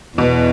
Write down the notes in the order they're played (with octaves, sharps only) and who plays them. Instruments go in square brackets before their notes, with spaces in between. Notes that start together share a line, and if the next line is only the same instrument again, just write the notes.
[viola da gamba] E2 [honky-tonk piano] B2